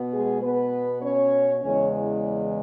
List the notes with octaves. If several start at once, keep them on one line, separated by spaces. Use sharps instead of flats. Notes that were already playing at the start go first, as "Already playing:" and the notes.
Already playing: B2 B3
G#3 G#4
B3 B4
C#4 C#5
E2 C#3 E3 G#3 C#4 C#5